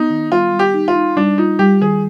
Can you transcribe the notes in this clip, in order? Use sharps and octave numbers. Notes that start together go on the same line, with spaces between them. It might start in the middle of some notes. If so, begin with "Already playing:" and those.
Already playing: B3 D#4
D#3
G3 F4
G3
G4
D#4
F4
D#4
G3 D4
D#4 F4
G3 G4
D#3 G#4